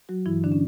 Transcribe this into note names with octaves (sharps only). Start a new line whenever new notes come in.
F#3 F#4
G2 E3 E4
D3 D4
C#4